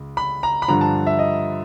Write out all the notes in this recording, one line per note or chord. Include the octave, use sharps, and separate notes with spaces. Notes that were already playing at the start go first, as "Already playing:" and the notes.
Already playing: C#2
B5
A#5
B5
G2 D3 F3 A#5
A5
E5
D#5